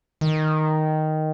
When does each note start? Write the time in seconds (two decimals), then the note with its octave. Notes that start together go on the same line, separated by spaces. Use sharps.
0.21 D#3